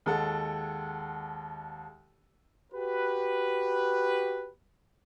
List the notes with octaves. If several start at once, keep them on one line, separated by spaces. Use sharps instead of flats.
D#2 G#3 A4 F#5
F#4 G4 B4